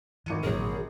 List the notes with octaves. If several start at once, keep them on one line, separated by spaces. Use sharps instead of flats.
G#1 E3 C#7 D#7
A1 A#2 C#3 F#3 G#4 A#4